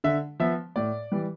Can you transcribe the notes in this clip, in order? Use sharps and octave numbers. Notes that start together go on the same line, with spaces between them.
D3 E5
F3 B3 E5
A2 D5
E3 G3